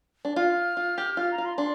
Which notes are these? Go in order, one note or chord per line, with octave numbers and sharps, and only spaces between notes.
D4
F4 F6
F4
G4
F4 F6
A#5
F4
C6
D4 C6